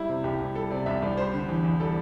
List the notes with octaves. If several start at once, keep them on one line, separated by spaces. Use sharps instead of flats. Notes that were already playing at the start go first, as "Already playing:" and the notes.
Already playing: G3 E4
C3
C2 G4
C2
G3 A4
C3 D5
C2 E5
C2 D5
G3 C5
D3
E2
E2
G3 A4